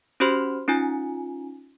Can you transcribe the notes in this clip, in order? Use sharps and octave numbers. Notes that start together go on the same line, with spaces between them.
C#4 F#4 G4 C5 B5 C6
C#4 D#4 F4 G#5